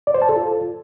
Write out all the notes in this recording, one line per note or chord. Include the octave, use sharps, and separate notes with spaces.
D5
C5
A5
A4
F4